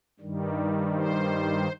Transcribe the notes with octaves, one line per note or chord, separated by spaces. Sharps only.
G2 D#3 G3
C5